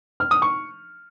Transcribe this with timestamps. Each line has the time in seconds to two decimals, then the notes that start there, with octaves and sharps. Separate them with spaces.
0.20 F6
0.31 D#6
0.42 C#6